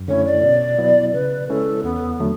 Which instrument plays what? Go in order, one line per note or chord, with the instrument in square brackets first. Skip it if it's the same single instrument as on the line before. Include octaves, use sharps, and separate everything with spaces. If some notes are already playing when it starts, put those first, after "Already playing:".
Already playing: [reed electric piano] F#2
[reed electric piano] D3 A3 C#4 E4 [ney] C#5
[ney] D5
[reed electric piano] B2
F#3 B3 E4
[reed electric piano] C#3 [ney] B4
[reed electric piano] G#3 C#4 E4 [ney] A4
[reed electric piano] E2 [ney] B3
[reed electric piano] D3 F#3 A3